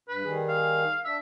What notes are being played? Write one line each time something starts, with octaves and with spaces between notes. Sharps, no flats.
G2 B4
D#3 G3 G#4
F5
D4 E5